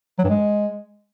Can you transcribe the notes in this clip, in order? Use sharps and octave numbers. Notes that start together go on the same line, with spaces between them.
F#3
G2
G#3